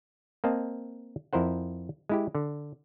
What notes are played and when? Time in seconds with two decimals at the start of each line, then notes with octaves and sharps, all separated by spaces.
0.44 A#3 C4 D#5 A5
1.33 F2 E4 A#4 C5 F#5
2.09 G#3 E4 G4
2.35 D3